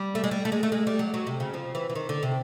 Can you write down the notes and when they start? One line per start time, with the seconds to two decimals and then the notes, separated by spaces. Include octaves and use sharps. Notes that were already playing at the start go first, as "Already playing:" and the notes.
Already playing: G3
0.15 A3
0.24 G#3
0.31 G3
0.45 A3
0.52 G#3
0.63 A3
0.72 G#3
0.87 G3
0.99 F#3
1.14 F#3
1.27 C3
1.40 C#3
1.54 F3
1.75 E3
1.90 E3
1.95 D#3
2.09 D3
2.23 C3